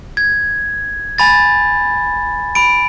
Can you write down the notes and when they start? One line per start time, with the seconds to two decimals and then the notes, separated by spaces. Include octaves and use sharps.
0.17 G#6
1.18 G#5 B5 A6
2.55 B5 D7